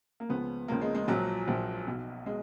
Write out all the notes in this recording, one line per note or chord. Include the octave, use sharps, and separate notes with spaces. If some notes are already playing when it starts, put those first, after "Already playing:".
A#3
C#2 C#3 F3 B3
C#2 C#3 F3 A#3
G#3
G#3
A#1 A#2 F3 F#3
A#1 A#2 F3
B1 B2
B2 G#3